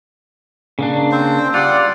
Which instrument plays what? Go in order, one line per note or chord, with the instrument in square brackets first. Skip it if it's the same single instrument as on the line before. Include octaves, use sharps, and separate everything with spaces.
[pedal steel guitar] C#3 A#3 D4
[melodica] C4 C5
[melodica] G3 D5 F#5 [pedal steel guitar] F4